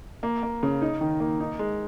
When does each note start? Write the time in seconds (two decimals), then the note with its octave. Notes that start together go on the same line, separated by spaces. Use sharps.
0.23 A#3
0.43 A#3
0.63 C#3
0.82 D#4
1.01 D#3
1.20 A#3
1.40 D#4
1.59 G#3